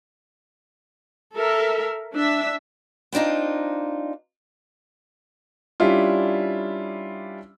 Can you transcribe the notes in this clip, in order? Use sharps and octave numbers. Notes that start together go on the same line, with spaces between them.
A4 A#4 E5
D4 E5
B3 C4 D4 D#4 F4
G3 C#4 D4 E4 F4